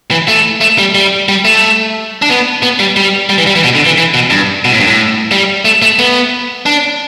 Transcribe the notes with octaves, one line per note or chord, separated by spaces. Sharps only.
E3
A3
A3
G3
G3
G3
A3
D4
B3
B3
G3
G3
G3
E3
G3
E3
B2
D3
E3
E3
B2
G2
B2
A2
G2
A2
G3
A3
A3
B3
D4